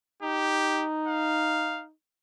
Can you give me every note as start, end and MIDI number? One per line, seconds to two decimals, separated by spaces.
0.23 1.91 63
0.23 0.86 67
1.08 1.84 77